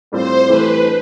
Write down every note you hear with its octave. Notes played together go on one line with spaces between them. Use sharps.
A2 G3 C4 F4 C5
E3 A3 E4 G4 B4
D4